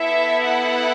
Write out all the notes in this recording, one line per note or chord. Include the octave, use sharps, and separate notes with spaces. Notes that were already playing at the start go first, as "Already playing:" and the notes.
Already playing: B3 E4 A4 E5
F#5